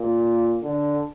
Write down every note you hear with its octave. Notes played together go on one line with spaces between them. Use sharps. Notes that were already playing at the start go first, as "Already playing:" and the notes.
Already playing: A#2
D3